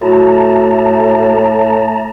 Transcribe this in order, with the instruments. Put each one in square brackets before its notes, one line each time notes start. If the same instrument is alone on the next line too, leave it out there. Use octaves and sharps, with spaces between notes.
[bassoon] A2 [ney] A3 [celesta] F#4 [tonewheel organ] A5 A#5